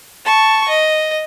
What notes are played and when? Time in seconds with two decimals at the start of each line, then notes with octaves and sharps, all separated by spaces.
0.25 A5 C#6
0.68 D#5